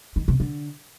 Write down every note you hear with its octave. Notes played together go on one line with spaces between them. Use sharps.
D#3
C3
D3